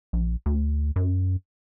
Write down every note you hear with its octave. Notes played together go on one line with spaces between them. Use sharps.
A#1
D2
F#2